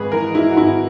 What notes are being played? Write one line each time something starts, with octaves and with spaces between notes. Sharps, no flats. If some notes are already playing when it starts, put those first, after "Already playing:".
Already playing: G#1 G#2 G#3 G#4 B4
E3 A#4
G#3 E4
F#4
G#1 E4